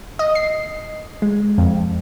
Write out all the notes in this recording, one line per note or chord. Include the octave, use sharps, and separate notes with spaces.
D#5
C7
G#3
F2